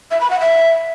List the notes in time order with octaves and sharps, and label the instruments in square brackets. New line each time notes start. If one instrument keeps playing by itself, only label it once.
[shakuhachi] E5
B5
F#5
E5